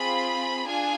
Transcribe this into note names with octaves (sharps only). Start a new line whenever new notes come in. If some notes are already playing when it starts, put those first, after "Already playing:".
Already playing: C4 F4 G#4 B5
D4 F4 G#4 G#5